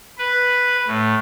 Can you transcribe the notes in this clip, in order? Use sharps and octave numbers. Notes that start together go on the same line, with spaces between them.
B4
A2